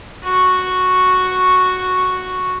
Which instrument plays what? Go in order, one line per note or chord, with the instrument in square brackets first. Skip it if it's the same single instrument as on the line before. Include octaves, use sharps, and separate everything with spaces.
[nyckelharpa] F#4 C#6